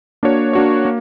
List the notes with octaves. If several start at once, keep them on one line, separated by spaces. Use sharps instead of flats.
A#3 D4 F#4 C#5
A#3 D4 F#4 C#5
A#3